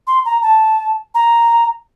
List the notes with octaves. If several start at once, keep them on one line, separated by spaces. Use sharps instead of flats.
C6
A#5
A5
A#5